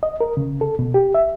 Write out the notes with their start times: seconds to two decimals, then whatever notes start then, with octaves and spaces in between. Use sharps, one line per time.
0.03 D#5
0.21 A#4
0.37 C#3
0.61 A4
0.79 B2
0.94 G4
1.15 E5